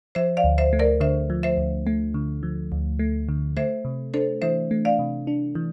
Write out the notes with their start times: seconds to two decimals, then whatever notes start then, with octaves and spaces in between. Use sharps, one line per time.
0.15 F3 C5 E5
0.37 D5 F5
0.44 D2
0.58 C5 E5
0.73 A3
0.79 A#4 D5
1.00 D3 C5 E5
1.30 F3
1.43 C5 E5
1.57 D2
1.87 A3
2.14 D3
2.43 F3
2.72 D2
2.99 A3
3.29 D3
3.57 A3 C5 E5
3.85 C3
4.14 D4 A4 C5
4.42 E3 C5 E5
4.71 A3
4.85 D5 F5
4.99 C3
5.27 D4
5.55 E3